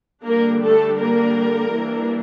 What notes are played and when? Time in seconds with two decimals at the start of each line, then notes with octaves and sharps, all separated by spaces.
0.24 D3 G3 A#3 D4 A#4
0.62 A3 A4
0.99 A#3 A#4
1.74 E3 G3 A#3 D4